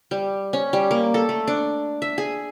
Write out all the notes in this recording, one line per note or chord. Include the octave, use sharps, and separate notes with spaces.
G3
C#4
G3
A#3
A4
A3
D4
E5
G#4